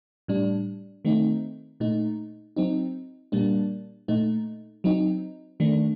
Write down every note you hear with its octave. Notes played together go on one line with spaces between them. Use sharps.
A2 G3 D4
D#3 A3 C4 D#4
A#2 A3 D#4
F#3 C4 D#4
A#2 G3 A#3 D4
A#2 A3 D#4
F#3 C4 D#4
D#3 A3 D4